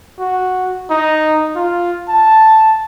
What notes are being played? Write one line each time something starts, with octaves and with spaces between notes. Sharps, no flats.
F#4
D#4
F4
A5